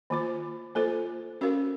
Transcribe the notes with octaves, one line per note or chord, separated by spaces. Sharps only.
D#3 A#3 F4 C5
A#3 F4 A4 C5
C#4 F#4 A#4 F5